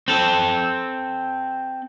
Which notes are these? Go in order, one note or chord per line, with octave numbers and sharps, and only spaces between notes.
C4 A4